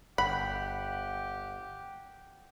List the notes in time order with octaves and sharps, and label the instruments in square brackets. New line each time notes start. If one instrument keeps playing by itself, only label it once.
[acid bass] G1 [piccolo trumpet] G4 [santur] F#5 [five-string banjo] B5